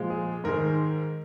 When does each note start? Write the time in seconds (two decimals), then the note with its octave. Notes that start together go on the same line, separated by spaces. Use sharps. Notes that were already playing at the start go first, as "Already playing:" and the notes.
Already playing: A#2 F3 G#3
0.10 G#4
0.44 G#2 D#3 G#3 A#4